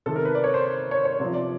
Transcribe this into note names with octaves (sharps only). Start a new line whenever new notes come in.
C3 D#3 A4
A#4
B4
D5
C#5
C5
C#5
C#5
C3 F3
D5